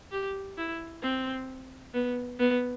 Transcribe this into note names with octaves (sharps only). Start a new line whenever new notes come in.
G4
E4
C4
B3
B3